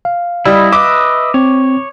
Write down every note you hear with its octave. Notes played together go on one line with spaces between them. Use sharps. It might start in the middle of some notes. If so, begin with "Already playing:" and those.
F5
G3 E4 D#5
B4 D#5 E5 D6
C4 C#5